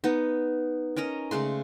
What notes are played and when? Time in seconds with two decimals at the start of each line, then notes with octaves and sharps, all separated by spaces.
0.04 B3 D#4
0.96 C#4 A#4 D#5 A#5
1.31 C#3 G#3 A3 C6